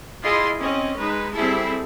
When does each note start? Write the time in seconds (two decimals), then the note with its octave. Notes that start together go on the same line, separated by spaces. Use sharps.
0.23 E4 F4 G#4 D#5 C6
0.60 C4 C#4 D#5
0.99 G#3 D#4 B4
1.34 G3 C4 E4 G#4 A4 E5